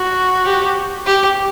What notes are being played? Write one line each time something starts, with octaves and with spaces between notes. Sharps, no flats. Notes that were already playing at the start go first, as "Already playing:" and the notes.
Already playing: F#4
G4
G4